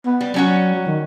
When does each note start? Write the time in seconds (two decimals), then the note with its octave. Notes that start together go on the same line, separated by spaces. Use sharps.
0.06 B3
0.21 G3
0.34 F#3 G3 C#4 F#4
0.74 F#3
0.87 D#3